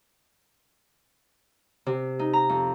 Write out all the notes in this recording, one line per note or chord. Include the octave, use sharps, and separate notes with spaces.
C3
D#4
A#5
F2